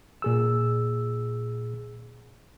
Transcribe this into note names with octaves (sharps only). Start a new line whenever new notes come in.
A#2 G#4 E6